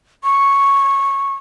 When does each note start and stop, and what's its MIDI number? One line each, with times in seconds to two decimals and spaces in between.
0.24 1.34 85